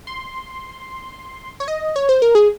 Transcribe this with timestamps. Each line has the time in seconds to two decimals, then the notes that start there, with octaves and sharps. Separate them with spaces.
0.07 C6
1.60 C#5
1.68 D#5
1.96 C#5
2.09 C5
2.22 A#4
2.35 G#4